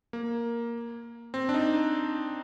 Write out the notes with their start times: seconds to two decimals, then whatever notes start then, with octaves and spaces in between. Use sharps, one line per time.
0.13 A#3
1.34 C4
1.49 D4
1.54 D#4